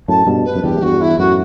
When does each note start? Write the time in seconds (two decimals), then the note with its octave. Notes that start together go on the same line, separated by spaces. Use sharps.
0.08 F#2 A2 A5
0.27 G2 B2
0.45 B4
0.55 F#2
0.63 E2 G2 G4
0.77 A2
0.82 E2 G2 F#4
1.01 E4
1.19 F#2 A2 F#4